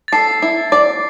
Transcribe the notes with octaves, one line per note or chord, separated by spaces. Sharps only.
A6
A4 C7
E4
D5